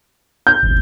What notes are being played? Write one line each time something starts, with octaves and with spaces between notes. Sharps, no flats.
G6
D#1 G#1